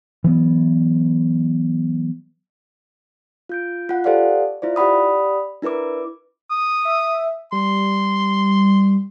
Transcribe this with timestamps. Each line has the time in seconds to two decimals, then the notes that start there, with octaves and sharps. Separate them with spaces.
0.24 E3 F#3 B3
3.49 F4 G6 D7
3.89 F4 F#5
4.04 G4 A4 C5 D5 F5 F#5
4.62 E4 F4 C5 D5
4.76 G4 D5 F#5 B5 D#6
5.62 D4 E4 A#4 B4 D6
6.51 D#6
6.85 E5
7.52 G3 C6